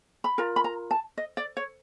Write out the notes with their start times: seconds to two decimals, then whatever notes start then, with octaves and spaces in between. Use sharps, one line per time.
0.24 B5
0.38 F4 A#4 A#5
0.56 B5
0.64 A#5
0.91 A5
1.18 D#5
1.37 D5
1.57 C#5